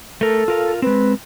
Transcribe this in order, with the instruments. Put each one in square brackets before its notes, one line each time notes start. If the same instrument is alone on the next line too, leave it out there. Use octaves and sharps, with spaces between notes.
[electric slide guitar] A3 A#4 [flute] A4
[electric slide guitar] F4 A#4 F5
[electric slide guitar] G#3 C4 [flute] B4